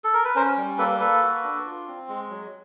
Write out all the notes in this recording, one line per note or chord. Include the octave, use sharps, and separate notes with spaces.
A4
A#4
B4
C#4 A#4 C5
G3
A#3 A4 B4
A#3 A4 B4
F#4
D4
F4
C4
G#3
F#3